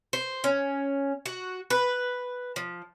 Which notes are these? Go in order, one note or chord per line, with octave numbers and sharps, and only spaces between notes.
C5
C#4
F#4
B4
F3